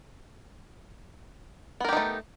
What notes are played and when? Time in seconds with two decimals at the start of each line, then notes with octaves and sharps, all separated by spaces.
1.80 B3
1.85 A#4
1.89 G4
1.93 D#4
1.97 A3